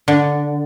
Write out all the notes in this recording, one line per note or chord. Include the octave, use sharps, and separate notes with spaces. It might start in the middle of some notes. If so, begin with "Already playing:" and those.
D3